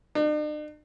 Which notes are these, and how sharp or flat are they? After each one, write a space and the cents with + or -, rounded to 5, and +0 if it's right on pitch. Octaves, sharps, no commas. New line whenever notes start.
D4 +45